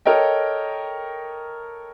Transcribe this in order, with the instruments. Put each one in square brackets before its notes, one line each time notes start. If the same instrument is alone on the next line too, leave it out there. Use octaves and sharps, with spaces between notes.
[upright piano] A4 A#4 C#5 D#5 G5